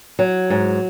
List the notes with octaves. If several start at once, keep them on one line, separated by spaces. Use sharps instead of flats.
F#3
G#2